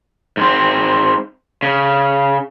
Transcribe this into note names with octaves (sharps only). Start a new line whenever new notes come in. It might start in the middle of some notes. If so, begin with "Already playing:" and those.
G#2 C4
C#3